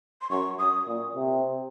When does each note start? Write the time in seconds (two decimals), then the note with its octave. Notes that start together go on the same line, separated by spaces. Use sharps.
0.22 C6
0.30 F#2 C#6
0.59 F#2 D#6
0.87 A#2
1.15 C3